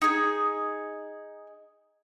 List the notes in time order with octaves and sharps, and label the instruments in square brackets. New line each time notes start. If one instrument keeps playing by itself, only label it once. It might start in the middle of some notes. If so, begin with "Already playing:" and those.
[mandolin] D#4 G#4